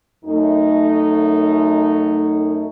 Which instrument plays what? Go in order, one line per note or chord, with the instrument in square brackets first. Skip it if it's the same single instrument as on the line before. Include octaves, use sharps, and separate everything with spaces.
[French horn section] F#2 A3 D#4